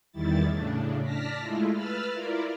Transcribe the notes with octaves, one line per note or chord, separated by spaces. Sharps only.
E2 D#3 G3 E4 A6
A2 C#3 D4
D5 A5 F6 A#6 B6
G#3 A3 E4 F4
B4 B5 E6 F6 A6
E4 F4 A#4 D5